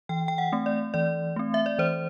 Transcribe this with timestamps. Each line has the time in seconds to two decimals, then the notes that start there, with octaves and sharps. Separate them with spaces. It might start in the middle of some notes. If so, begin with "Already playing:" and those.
0.09 E3 G5
0.28 G5
0.38 F#5
0.53 A3 C4
0.66 D5
0.94 E3 D5
1.36 A3 C4
1.54 E5
1.66 D5
1.79 E3 C5